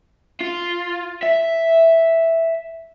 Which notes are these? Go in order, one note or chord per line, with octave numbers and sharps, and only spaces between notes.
F4
E5